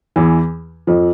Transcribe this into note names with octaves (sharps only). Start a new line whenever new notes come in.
E2 E3
F2 F3